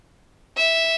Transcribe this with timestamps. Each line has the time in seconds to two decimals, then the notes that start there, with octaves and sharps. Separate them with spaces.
0.57 E5